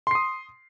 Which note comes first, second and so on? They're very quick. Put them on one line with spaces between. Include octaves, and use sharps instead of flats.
C6 C7 D#6